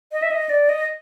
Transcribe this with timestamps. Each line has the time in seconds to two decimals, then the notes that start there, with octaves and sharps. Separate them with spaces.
0.12 D#5
0.22 E5
0.31 D#5
0.49 D5
0.69 D#5